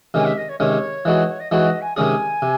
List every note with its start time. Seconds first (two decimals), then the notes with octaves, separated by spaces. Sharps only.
0.14 C3 D#3 G#3 C#4 G#5
0.25 E5
0.37 D#5
0.49 C#5
0.60 C3 D#3 G#3 C#4 C#5
1.05 E3 G#3 D#4 F#4
1.40 D#5
1.51 E3 G#3 D#4 F#4 C#5
1.66 D#5
1.81 G#5
1.97 C3 D#3 G#3 C#4 G#4 G#5
2.42 C3